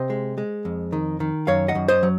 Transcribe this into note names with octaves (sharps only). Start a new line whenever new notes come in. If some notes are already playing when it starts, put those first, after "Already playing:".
Already playing: C3 C5 D#5
G#3
G#3
F2
D#3
D#3
F#2 C#5 F5
D#5 F#5
F#2
C5 D#5
F#3